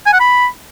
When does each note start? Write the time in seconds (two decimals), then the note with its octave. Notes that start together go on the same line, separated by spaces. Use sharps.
0.06 G#5
0.13 F#5
0.20 B5